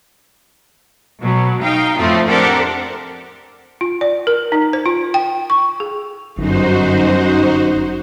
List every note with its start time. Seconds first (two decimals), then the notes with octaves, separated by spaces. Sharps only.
1.21 B2 F#3
1.62 D#4 F5 G5
1.96 F2 A2 F3 A3 C4 F4
2.29 C4 D4 G4 A4 A#4 F#5
3.81 F4
4.01 D5
4.27 A#4
4.52 D#4
4.73 C5
4.86 F4
5.14 G5
5.50 C#6
5.80 G#4
6.37 G1 F#2 D#4 F#4 C5